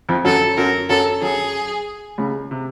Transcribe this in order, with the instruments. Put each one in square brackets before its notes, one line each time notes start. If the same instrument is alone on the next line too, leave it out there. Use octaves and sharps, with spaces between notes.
[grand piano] F2 F3
[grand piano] F#2 F#3 [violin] A4
[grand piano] F#2 F#3 [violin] A#4
[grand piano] F#2 F#3 [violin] A4
[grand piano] F#2 F#3 [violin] G#4
[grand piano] C#2 C#3
C3